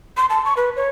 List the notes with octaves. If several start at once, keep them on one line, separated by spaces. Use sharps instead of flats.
C6
A5
C#6
B4
C#5